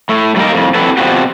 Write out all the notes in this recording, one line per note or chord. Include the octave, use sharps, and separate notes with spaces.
A2 A3
F#3 G3 A#3 D#4 A#4
F2 A2
C4 D4 E4 F#4 A4 B4
B2 F3 G#3 C4 F#4 G4